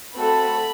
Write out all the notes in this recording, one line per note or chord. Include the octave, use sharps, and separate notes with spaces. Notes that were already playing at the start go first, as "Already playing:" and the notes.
A3 C4 F#4 A4 B5